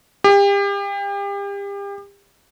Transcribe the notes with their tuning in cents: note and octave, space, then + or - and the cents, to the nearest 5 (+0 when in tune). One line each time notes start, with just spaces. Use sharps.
G4 +35